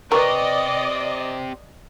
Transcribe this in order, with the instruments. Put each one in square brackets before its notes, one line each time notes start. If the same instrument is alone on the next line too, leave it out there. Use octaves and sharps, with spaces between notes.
[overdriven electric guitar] C4 G4 [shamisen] A#4 [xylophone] B4 C#6 [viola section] D5 D#5